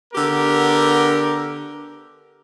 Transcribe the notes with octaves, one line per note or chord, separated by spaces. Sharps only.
D3 B3 G4 A#4